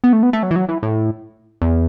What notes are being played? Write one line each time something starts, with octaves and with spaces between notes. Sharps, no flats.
B3
A3
B3
A3
F#3
E3
F#3
E3
A2
E2